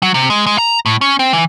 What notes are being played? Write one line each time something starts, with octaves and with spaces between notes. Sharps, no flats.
F#3
C3
G#3
G#3
A#5
A2
C#4
C4
E3